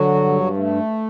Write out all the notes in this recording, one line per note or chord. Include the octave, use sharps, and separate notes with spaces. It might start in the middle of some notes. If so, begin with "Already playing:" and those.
Already playing: D3 F#3 F#4
G2
A3